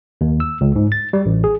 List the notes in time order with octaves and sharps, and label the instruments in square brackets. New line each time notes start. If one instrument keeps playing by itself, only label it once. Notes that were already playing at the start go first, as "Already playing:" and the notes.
[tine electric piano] D#2
E6
C#2
G#2
A6
G3
A1
G#4